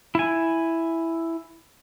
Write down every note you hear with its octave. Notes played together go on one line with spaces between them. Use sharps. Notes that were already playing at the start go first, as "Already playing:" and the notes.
E4 G#5